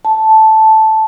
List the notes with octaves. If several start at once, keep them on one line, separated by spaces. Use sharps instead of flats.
A5